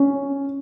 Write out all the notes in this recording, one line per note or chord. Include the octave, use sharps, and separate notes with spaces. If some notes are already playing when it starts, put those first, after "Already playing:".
Already playing: C#4